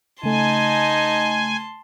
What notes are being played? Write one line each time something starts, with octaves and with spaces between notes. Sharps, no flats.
C#3 A3 D#4 G#5 A5 C6